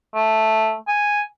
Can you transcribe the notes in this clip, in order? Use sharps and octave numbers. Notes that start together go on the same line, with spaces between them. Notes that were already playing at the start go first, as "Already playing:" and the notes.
A3
G#5